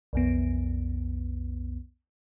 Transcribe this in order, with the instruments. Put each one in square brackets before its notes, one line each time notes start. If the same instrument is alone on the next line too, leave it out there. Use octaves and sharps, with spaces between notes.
[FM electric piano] B1 F2 B3